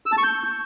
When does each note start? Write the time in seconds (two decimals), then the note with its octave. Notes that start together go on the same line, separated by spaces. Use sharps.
0.06 E6
0.12 A5
0.18 C#6
0.24 G6